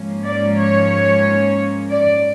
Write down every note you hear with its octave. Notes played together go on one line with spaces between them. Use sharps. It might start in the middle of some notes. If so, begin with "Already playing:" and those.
Already playing: G#2 F3 A#3 C#4
D5
C#5
D5